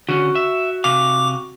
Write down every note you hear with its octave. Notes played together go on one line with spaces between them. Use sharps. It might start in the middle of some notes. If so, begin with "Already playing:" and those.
D3 C#4 F#4
E5
C3 F5 D6